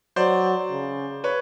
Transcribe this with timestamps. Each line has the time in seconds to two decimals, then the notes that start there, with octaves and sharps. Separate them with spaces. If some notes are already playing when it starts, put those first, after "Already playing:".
0.16 F#3 C5 D5
0.70 C#3
1.24 B4 C#5